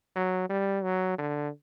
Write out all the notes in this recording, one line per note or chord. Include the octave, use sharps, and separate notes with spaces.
F#3
G3
F#3
D3